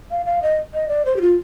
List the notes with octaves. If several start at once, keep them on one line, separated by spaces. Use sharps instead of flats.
F5
F5
D#5
D#5
D5
C5
G4
F4